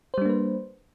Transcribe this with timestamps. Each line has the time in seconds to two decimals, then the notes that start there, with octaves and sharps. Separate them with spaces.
0.14 C5
0.18 G3
0.22 D4
0.26 A#3
0.29 B4